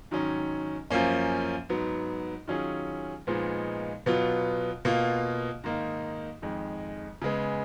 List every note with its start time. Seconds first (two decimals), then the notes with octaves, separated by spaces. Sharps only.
0.11 G#2 D#3 F#3 C#4
0.90 F#2 F3 A#3 C#4
1.69 G#2 F#3 B3
2.48 D#3 F#3 C#4 F4 G#4
3.27 A#2 F3 G#3 B3 D#4
4.06 B2 F#3 B3 F4
4.85 B2 A#3 F4
5.64 G#2 D#3 A#3 D#4
6.42 F2 D#3 G#3
7.22 C#3 G#3 B3